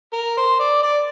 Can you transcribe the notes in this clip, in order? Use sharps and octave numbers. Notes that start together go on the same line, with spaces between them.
A#4
C5
D5
D5